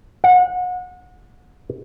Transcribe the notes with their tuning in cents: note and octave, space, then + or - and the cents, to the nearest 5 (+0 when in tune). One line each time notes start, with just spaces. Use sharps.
F#5 -30